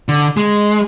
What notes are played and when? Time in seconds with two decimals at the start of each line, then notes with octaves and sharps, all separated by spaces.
0.09 D3
0.37 G#3